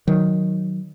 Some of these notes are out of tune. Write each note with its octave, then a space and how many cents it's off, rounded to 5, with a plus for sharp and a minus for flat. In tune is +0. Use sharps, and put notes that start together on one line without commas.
D#3 +0 F#3 +0